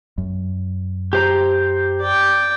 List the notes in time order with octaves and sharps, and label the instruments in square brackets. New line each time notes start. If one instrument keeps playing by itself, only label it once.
[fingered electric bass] F#2
[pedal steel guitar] G4 C5 A#5
[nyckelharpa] D5 G5